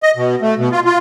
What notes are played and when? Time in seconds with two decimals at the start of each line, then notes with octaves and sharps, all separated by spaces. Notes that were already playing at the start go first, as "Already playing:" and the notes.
0.03 D#5
0.17 B2
0.42 A3
0.58 B2
0.72 F4
0.85 F4